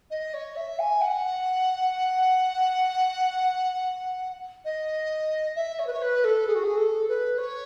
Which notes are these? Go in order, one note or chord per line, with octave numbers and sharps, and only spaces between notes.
D#5
C#5
E5
G#5
F#5
D#5
E5
C#5
B4
C#5
B4
A4
G#4
F#4
G#4
A4
B4
C#5